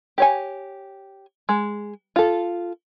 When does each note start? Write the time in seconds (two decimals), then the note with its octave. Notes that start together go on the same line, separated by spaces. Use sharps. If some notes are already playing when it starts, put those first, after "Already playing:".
0.18 G4 C#5 G#5
1.49 G#3
2.16 F4 A4